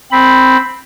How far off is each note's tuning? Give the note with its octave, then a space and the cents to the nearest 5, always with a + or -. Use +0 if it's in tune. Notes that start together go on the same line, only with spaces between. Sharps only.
C4 +0 B5 +0